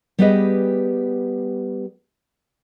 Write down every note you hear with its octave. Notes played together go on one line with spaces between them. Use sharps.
G3 B3 G4 G#4 B4 D#5